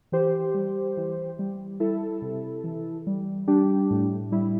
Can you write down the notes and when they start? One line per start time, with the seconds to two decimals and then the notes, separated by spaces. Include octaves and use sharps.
0.12 E3 G4 C5
0.54 G3
0.97 E3
1.39 G3
1.80 G3 E4 A4
2.22 C3
2.64 E3
3.07 G3
3.48 G3 D4 G4
3.90 A2
4.32 G3 E4